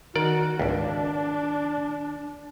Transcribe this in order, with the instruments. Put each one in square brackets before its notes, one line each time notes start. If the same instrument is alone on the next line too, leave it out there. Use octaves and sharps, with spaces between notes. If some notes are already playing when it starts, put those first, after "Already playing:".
[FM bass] D#3 [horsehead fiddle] F#4 [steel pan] A#4 [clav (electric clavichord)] D5
[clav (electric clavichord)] G#1 C#2 [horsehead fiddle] D4